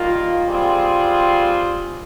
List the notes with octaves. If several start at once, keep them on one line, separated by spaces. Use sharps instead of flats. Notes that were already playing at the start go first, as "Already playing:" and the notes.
Already playing: D#3 G3 A#3 F4
G3 C4 F4 G#4